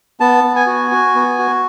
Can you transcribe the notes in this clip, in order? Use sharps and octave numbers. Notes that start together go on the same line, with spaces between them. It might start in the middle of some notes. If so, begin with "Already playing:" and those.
B3 A5
B3
G#5
F#4
F#4
B3
F#4